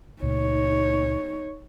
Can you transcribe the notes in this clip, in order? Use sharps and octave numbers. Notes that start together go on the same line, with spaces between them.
C#2 A#2 A3 D#4 C#5